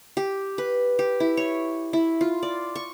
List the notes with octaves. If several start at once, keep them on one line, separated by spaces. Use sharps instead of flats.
G4
B4
G4
E4
C#5
E4
F4
D5
C#6